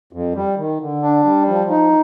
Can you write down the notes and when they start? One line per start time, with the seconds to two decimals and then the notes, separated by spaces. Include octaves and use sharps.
0.13 F2
0.34 G3
0.57 D#3
0.80 D3
1.02 D4
1.25 G3
1.48 F3
1.70 D#4